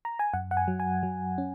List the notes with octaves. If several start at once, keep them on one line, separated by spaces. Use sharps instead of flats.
A#5
G#5
F#2 F#5
F#5
G#5
F#3
G#5
F#3
C#4